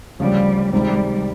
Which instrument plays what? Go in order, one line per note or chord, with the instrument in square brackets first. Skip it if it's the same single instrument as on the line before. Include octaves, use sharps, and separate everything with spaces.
[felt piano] D2 C#3 F3 [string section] G3
[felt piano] C#2 C3 D#3 G#3 [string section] G3